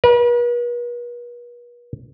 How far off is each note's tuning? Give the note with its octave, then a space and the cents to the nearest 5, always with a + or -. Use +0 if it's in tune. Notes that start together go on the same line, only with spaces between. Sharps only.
B4 -45